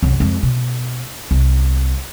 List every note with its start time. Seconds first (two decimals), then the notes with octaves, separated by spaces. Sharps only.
0.03 C2 F#2
0.20 F2 G#3
0.43 B2
1.31 C2